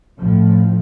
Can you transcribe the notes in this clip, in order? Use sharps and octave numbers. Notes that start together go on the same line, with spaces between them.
A1 A2 F3